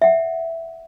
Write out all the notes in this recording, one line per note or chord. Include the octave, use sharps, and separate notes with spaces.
E5 F#5